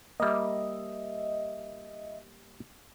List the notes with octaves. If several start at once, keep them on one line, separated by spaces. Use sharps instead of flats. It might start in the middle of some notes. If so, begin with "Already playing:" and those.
G3 A#3 D#5 E5